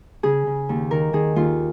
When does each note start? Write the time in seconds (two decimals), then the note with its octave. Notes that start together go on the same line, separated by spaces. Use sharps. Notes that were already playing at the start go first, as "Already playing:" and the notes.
0.23 C#3 G#4
0.47 C#3
0.69 D#2
0.91 D#3 A#4
1.13 D#3 G#4
1.36 D#2 F4